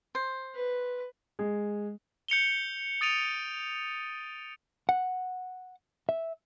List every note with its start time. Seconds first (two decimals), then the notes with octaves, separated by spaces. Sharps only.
0.15 C5
0.55 B4
1.39 G#3
2.28 G6 C#7 F7 G7
3.01 D#6 A6 D7 D#7 F7
4.89 F#5
6.09 E5